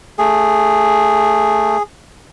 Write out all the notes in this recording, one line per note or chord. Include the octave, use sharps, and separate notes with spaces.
A3 G#4